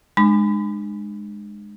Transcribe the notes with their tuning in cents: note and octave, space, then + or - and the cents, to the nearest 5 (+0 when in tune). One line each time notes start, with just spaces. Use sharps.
G#3 +0 D4 +45 B5 +35